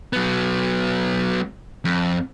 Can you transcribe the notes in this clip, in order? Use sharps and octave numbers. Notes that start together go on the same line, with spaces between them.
F#3 B3
F2